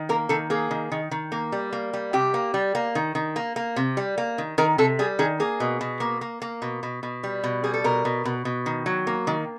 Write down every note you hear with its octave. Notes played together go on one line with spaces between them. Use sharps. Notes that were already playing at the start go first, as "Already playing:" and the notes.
Already playing: D#3
A#3 A#4
D#3 A4
A#3 G#4
D#3
D#3
D#3
A#3
G3
A#3
G3
C3 G4
A#3
G3
A#3
D#3
D#3
A#3
A#3
C3
G3
A#3
D#3
D#3 A#4
C3 A4
G3 G#4
D#3 G#4
A#3 G#4
B2
B2
A#3
A#3
A#3
B2
B2
B2
G3
B2
G3 G#4
A4
B2 A#4
B2
B2
B2
D#3
F#3
A#3
D#3